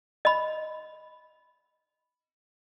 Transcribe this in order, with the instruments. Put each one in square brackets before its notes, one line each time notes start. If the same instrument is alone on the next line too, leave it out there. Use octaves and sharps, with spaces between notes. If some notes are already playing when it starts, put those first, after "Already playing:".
[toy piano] D#5 B5